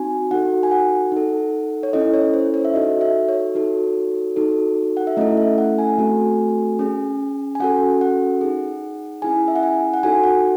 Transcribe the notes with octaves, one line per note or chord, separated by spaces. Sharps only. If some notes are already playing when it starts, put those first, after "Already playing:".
Already playing: C4 D#4 F#4 G#5
D#4 F#4 A4 F#5
G#5
F#5
D#4 A4
C#5
C#4 E4 A4 D#5
C#5
C5
C#5
E5
D#4 F#4 A4 D#5
E5
C#5
D#4 F#4 A4
D#4 F#4 A4
F#5
E5
A3 C#4 E4 A4 D#5
E5
F#5
G#5
A3 C4 F#4 A4
C#4 G#4
G#5
C#4 F#4 A4 F#5
F#5
D#4 G#4
C#4 E4 G#4 G#5
E5
F#5
G#5
F#5
D#4 F#4 A4 G#5
F#5